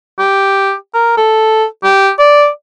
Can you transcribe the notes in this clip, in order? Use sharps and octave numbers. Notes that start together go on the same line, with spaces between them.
G4
A#4
A4
G4
D5